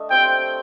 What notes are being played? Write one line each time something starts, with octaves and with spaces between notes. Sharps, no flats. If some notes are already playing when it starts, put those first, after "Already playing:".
Already playing: A3 D4 A4 D#5
C4 G4 C5 G5